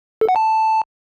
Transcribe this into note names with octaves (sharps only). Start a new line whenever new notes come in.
A4
F#5
A5